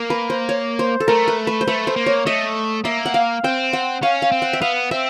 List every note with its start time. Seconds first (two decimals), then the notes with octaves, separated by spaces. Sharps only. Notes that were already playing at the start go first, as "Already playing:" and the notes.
Already playing: A#3
0.10 B4
0.30 C5
0.49 C#5
0.79 C5
1.00 A4
1.08 A3 A#4
1.28 B4
1.47 B4
1.61 C5
1.68 A3 B4
1.87 C5
1.96 A#3
2.06 C#5
2.26 A3 D#5
2.84 A#3 E5
3.06 F#5
3.14 F5
3.44 C4 G5
3.73 F#5
4.03 C#4 F5
4.22 F5
4.32 C4
4.42 F#5
4.53 E5
4.62 B3 F5
4.91 C4 E5